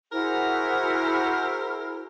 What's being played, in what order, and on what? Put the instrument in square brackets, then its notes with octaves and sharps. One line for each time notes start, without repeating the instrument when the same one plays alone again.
[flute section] E4 F#4 C5 [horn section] G#4 A#4